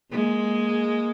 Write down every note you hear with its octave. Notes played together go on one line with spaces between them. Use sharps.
G#3 A#3